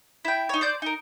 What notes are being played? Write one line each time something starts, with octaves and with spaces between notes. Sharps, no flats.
E4 G5
D#4 C#5
C5 D5 G6
D#4 A#4